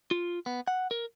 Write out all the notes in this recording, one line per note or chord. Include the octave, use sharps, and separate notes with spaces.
F4
B3
F#5
A#4